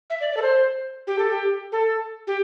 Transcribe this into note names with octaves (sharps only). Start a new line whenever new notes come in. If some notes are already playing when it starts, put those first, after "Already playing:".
E5
D5
D5
A4
C5
G4
A4
G4
A4
G4